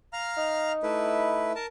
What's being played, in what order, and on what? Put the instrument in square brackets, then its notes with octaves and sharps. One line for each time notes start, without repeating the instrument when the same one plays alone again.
[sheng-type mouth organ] F5 A#5 F6
[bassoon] D#4
[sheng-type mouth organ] A3 E4 B4
A#4 A5